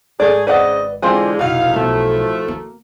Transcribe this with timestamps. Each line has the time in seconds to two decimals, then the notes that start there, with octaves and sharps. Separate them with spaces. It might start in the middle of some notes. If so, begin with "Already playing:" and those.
0.20 G#1 A3 G#4 D5
0.47 C#3 C4 B4 D5 D#5 F#5
1.02 D3 E3 G#3 C4 F4 G#4
1.39 F1 B1 D#4 E4 F#4 F5
1.74 B1 A2 F3 A3
2.48 A#3